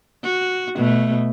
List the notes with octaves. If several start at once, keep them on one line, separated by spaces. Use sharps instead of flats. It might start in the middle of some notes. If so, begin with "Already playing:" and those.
F#4
B2 A3